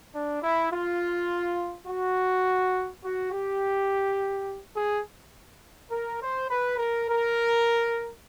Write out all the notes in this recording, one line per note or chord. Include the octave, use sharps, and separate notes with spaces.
D4
E4
F4
F#4
F#4
G4
G#4
A#4
C5
B4
A#4
A#4